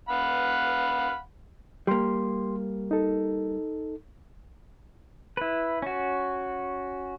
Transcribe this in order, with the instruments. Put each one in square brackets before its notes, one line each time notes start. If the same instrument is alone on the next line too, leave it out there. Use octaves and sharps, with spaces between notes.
[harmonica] F5 F#5 B5
[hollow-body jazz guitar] G3 A#3 [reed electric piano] G4 C6
[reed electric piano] D#4 A4
[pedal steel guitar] E4 B4
C#4 F#4